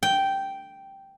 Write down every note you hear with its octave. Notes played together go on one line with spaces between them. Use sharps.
G5